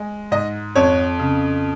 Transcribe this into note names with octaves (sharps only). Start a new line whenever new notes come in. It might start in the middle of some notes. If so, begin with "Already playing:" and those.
Already playing: G#3
G#2 D#5
F2 C#5
C#3